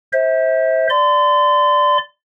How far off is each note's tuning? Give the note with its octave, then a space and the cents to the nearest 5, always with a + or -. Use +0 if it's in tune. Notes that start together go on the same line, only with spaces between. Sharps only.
C5 +15 E5 -30
D5 +0 C6 -35